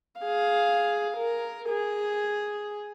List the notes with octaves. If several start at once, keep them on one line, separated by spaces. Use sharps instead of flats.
G#4 F5
A#4
G#4